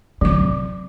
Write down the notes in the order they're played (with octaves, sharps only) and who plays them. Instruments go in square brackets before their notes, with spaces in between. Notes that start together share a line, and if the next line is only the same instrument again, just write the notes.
[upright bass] F2 D3 [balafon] F#3 D6
[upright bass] C3